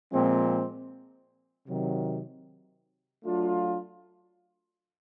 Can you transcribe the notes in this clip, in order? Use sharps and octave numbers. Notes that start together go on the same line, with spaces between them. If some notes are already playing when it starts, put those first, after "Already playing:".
A#2 F3 G#3 C4
C3 D#3 F#3
F#3 A3 D4 F4